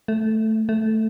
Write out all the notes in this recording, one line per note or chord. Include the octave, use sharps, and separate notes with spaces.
A3
A3